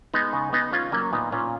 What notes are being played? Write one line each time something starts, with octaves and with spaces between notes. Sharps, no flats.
G#3 B3 D#4
C#3
C#3 B3 D#4
G#3 C#4 F4
F#3 A#3 C#4
A#2 B3 D#4
A#2 C#4 F4